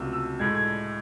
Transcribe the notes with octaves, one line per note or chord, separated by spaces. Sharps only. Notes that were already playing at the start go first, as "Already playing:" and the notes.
Already playing: C#2 C3 F#3 A3 E6
E6
A2 G#3 G#6
G#6